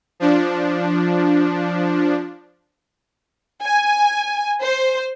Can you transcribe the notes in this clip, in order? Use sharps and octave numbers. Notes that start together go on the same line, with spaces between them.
F3 D4
G#5
C5